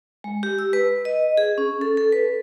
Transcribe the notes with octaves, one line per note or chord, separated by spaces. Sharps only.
G#3
G4
E6
B4
D#5
G#4
C#4
A4
A4
B4